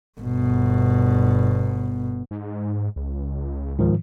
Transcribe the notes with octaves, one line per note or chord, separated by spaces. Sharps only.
G1 B2
G#2
C#2
G#2 D#3 F3